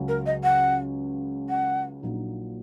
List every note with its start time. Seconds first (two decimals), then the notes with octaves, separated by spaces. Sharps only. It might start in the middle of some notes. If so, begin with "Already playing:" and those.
Already playing: C#2 C#3 F#3 C#4
0.08 A#4
0.26 D#5
0.44 F#5
1.49 F#5
2.02 A#1 A#2 F#3 D#4